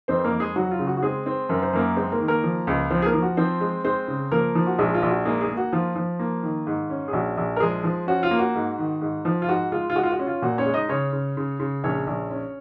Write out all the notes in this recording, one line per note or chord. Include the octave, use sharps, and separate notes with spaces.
F2 C4 C5
C5
A#3 A#4
F2
G#3 G#4
F#3 F#4
F4
C#3
F#4
F#4
G#3 C4 G#4
C4
F#2 A#4
C5
F#2 A#3 A#4
G#3 C4 C5
A#3 A#4
D#3
A#3 A#4
F3
C#2
F3 C4 C5
G#4
A#3 A#4
F3
F#4
F3 C4 C5
G#3
G#3 C4 C5
C#3
F3 A#3 A#4
F3
F#4
A#1 G#3 G#4
F4
A#1
F#4
G#3 A#3 G#4
G#3 G#4
A#3
F#4
F3 F4
F3
A#3
D#3
G#2
C#4
G#4
A#1 F#4
A#1
A#4
F3 G#3 G#4
F3
C#4 F#4
F4
A#3
F#4
G#2
D#3
G#2
F3
F4
G#2 F#4
G#3 F4
F4
G#3 F#4
F4
F#4
C#4
F4
A#2 F#4
C#4 C#5
G#3
D#4 D#5
C#3 C#4 C#5
C#3
C#3
C#3
A#1 C#4 C#5
A#1
C#4